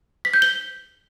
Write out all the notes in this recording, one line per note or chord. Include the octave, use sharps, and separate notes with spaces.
B6
G6
G7